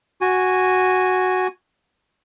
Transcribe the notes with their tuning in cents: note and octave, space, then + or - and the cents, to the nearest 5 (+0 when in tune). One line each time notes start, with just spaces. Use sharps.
F#4 +0 G#5 -5